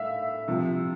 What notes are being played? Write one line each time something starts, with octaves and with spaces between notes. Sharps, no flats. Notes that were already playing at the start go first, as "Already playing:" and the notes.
Already playing: A2 E5 F5
C3 F3